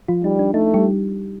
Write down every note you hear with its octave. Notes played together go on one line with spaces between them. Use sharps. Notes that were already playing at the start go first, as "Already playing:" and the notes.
F3 F4
G3 D#4
D4
A3 D#4
G3 G4